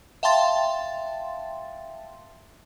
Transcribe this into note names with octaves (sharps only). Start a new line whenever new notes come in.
E5 F5 G5 A5 C6 A6